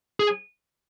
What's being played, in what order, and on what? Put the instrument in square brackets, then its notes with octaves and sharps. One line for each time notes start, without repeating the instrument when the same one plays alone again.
[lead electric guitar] G#4